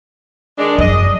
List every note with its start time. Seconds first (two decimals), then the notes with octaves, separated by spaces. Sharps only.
0.58 D#3 G#3 D4
0.79 F#2 D#5